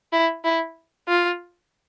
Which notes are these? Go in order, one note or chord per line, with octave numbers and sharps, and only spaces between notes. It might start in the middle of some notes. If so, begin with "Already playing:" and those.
E4
E4
F4